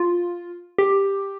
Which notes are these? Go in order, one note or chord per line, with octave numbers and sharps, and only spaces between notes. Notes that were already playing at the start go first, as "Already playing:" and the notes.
Already playing: F4
G4